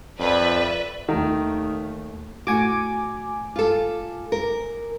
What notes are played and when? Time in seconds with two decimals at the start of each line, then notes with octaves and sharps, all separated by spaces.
0.19 F2 B4 D5 E5
1.09 D#2 D#3 A3
2.47 A2 F#4 G#5 D6
3.56 F4 A4
4.32 A#4